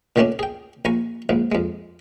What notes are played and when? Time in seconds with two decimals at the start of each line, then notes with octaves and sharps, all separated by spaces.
0.16 A#2 D3 D#3 A3 C#4 D4
0.39 G#4 G5
0.85 A#1 G#5 A#5 C#6
1.29 A#1 G#2
1.52 F2 G#3